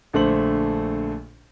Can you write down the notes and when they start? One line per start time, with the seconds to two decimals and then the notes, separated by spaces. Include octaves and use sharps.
0.13 A#1 D3 A3 C5 F#7